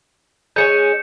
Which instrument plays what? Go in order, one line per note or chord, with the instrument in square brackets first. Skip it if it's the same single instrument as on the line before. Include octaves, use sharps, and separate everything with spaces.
[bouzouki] G#3 A3 C#4 [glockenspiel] G6 C#7 E7